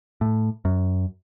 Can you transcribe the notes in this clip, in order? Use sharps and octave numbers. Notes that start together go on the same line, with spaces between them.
A2
F#2